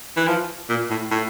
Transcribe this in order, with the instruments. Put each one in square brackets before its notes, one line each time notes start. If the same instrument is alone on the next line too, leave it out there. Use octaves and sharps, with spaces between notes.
[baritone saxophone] E3
F3
A#2
A2
A2